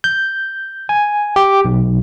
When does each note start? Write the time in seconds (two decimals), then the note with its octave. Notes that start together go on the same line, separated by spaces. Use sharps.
0.04 G6
0.89 G#5
1.36 G4
1.65 B1